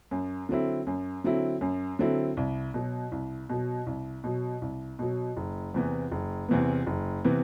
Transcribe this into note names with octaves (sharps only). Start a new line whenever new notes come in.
F#2
D3 F#3 C4 E4
F#2
D3 F#3 C4 E4
F#2
D3 F#3 C4 E4
C2
B2 F#3
C2
B2 F#3
C2
B2 F#3
C2
B2 F#3
F#1
E2 C3 E3 B3
F#1
E2 C3 E3 B3
F#1
C3 E3 B3